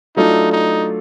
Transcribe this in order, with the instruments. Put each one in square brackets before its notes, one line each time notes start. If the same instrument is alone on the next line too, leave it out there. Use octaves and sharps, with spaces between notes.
[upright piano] F#3 A3 D4 F4 A4 [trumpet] D#4
[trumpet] D#4